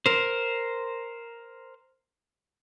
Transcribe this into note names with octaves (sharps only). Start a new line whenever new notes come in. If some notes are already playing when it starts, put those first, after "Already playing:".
A#4 C5